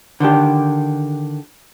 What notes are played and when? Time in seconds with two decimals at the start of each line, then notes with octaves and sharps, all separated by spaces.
0.20 D3 D#3 D4 G4